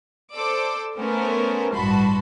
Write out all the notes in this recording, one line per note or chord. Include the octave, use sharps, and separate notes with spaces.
A4 C5 D5 D6 E6
A3 B3 C#4 A#4 C5
A1 G2 F#4 A5 B5 C6